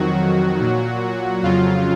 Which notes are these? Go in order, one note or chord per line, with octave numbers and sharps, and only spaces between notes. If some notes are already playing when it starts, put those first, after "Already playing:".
Already playing: F2 D#3 F#3 F#4
A#2 F#3
F2 C#3 F#3 F4